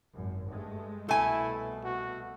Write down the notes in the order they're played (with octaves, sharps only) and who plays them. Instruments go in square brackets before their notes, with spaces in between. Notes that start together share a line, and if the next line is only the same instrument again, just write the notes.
[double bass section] G#1 F#2
G2 G#3 A3
[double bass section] C2 B2 [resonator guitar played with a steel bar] A3 G#5 [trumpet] E4
[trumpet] F#4